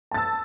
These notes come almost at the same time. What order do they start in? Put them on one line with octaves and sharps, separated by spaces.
A5 A6 E6